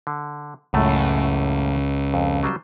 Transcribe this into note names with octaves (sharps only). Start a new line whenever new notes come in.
D3
C#2 F#2 A2 A3
F2
F#3 G3 C5